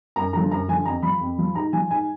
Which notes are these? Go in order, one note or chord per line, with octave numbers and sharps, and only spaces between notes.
F#2 A#5
D3 F3 A#5
F#2 A#5
D3 F3 G#5
F2 A#5
F3 B5
F2
F3
G#2 A#5
F3 G#5
G#2 G#5